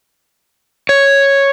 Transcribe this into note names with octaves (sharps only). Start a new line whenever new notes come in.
C#5